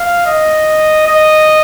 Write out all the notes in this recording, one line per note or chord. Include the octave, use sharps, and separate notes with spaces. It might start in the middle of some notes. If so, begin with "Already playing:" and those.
Already playing: F5
D#5
D#5